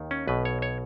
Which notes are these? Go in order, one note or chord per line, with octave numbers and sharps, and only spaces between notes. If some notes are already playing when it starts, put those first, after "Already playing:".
Already playing: D#2 D#3
C#4
B1 B2 B4
C#5
C#5